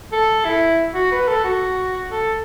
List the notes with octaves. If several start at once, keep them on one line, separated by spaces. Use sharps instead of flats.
A4
E4
F#4
B4
A4
F#4
A4